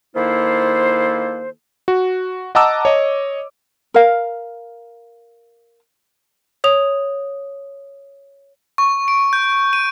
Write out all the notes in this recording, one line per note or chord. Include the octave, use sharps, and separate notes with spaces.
D#3 A#3 E4 F4 A4 C5
F#4
D#5 F#5 A5 A#5 D6 E6
C#5 D#5
A#4 F5
C#5 D#6 F7
C#6
D7
G6
D#7